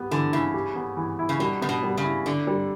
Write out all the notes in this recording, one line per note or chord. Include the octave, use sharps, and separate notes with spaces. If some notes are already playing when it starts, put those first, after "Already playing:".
Already playing: B3 G4
D3 E3
C#3 E4
G4
B3
E3
E4
C#3
B2 G3
C#3 B3
B2
G3
C#3
E4
D3 D4
G3